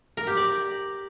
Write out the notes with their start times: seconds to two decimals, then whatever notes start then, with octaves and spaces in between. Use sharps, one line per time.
0.17 A#4
0.27 G4
0.37 D5